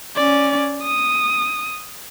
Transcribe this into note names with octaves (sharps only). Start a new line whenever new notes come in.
C#4 D5
D#6